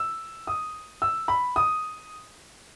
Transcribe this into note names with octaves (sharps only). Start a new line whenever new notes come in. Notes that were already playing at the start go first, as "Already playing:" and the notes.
Already playing: E6
D#6
E6
B5
D#6